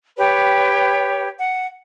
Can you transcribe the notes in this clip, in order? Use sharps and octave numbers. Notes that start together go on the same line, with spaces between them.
G4 B4 C#5 G5
F#5